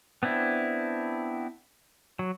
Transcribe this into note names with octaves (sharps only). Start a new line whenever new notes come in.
B3 C4 D4 E4
F#3